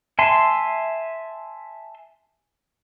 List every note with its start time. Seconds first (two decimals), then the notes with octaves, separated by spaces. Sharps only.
0.19 E5 G#5 A5 C6